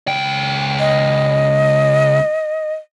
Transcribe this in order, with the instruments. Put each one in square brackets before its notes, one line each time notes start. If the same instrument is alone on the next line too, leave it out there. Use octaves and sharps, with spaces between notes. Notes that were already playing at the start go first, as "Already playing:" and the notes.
[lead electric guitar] C#2 G5
[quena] D#5